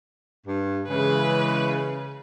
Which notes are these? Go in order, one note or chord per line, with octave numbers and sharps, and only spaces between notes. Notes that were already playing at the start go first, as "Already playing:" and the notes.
G2
C#3 E3 G#3 B4